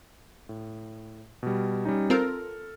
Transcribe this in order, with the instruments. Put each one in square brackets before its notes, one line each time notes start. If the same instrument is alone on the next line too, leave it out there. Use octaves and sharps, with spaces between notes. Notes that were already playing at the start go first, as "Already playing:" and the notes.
[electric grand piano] A2
B2 G3
G3 C#4 D#4
[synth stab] C4 F4 A#4 [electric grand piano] A4 F6